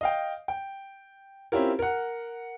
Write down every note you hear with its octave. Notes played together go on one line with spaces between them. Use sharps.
D#5 F5 G5
G5
C4 C#4 E4 F4 G4 A#4
A#4 F#5